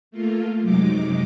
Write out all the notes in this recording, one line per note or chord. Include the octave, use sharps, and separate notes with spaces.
A3 A#3 F4
F#2 C3 F#3 G#3 D#4 D6